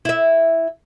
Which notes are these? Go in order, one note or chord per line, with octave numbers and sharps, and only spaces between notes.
E4 E5